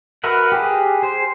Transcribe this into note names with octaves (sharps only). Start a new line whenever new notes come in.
F#4 A#4 B4 E5 F#5
G4 G#4
G#4 C5